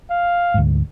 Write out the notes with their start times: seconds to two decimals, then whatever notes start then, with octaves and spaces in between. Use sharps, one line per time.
0.11 F5
0.54 D2 G#2